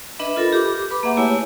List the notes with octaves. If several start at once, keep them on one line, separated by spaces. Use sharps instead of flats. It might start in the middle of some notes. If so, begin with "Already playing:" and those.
D4 B4 D#5 E5 B5
F4 A4 A#4 B5
G4 D6
B4 B5 D6
A#3 G#4 E5 F#5
A3 E4 G4 C#5 G#5